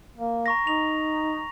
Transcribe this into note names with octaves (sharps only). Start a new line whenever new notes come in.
A#3
A#5 C#6 A#6
D#4 F7